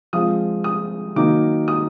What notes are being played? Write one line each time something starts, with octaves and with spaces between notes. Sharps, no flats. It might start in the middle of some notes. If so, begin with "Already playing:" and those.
F3 G#3 C4 F4 D#6
D#6
D#3 F#3 A#3 D#4 D6
D#6